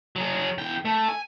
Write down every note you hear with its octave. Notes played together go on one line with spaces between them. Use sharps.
F#3 G#4
E2 G5
A3
G#5